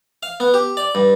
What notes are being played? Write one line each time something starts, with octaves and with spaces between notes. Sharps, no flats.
F5
B3
G4
D5
G2